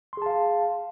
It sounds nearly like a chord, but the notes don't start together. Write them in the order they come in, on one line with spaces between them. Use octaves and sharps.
C6 G#4 A5 F5